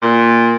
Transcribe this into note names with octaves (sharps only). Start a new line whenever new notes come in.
A#2